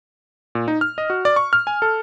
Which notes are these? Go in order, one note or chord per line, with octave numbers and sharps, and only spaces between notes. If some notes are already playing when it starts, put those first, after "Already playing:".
A#2
D#4
F6
D#5
F#4
D5
C#6
F6
G#5
A4